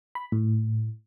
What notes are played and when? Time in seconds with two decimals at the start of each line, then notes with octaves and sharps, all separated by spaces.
0.15 B5
0.32 A2